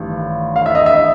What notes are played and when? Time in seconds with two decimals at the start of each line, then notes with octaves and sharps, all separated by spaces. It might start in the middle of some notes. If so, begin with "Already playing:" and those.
Already playing: A1 G2 D#3
0.56 F5
0.66 E5
0.75 D#5
0.86 E5